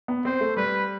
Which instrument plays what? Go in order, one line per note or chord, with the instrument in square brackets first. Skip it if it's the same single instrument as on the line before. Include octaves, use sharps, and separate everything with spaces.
[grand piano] B3
[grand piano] C4 [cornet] C5
[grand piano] A3
[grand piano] G3 [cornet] B4